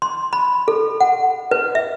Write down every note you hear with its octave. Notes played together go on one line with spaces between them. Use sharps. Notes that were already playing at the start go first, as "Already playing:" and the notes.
C6
B5
A4
F#5
B4
E5